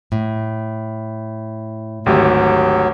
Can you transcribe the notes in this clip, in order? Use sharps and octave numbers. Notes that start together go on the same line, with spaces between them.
A2
G#1 D2 F#3 G4